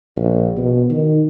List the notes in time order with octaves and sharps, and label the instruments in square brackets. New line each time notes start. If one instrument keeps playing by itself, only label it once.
[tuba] A#1
B2
D#3